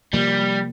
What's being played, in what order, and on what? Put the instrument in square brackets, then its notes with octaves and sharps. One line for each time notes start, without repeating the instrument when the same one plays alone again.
[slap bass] C3 F3 A#3 [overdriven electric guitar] G3